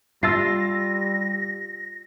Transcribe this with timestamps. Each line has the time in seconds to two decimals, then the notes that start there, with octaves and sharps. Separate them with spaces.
0.23 G3 F4 E6 A6 A#6 C7